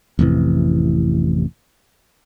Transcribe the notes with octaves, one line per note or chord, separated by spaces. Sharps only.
A1 F2 C3 E3